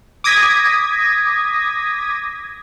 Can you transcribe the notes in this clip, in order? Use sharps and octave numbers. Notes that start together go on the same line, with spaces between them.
D6 D#6 G#6 A#6 B6